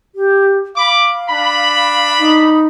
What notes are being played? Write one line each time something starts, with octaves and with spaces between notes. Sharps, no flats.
G4
F5 B5 D6
D4 B5
D#4